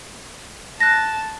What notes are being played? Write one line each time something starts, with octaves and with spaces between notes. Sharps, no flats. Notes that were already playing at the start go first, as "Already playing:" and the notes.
A5 F#6 A#6